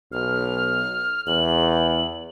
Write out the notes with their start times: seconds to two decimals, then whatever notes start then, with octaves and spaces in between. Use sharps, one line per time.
0.12 B1 F6
1.27 E2 F#7